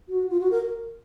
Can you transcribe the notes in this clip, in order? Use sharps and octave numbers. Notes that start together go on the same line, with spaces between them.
F#4
F4
F#4
A#4